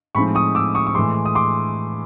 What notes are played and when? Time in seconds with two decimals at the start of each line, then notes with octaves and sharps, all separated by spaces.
0.15 A2 F3 G#3 C4 D#4 B5 C#6
0.35 C#6 D#6
0.55 D6 E6
0.75 C#6 D#6
0.87 C#6
0.95 A2 E3 G#3 C6 D6
1.25 D#6
1.35 C6 D6